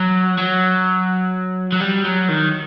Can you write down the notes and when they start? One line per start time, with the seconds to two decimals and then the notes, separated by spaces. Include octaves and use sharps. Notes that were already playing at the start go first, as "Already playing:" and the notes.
Already playing: F#3
0.38 F#3
1.72 F#3
1.80 G3
2.05 F#3
2.29 D#3